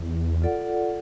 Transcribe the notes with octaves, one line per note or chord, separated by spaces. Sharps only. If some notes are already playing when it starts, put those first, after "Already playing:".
Already playing: E2
F4 A4 D5 F#5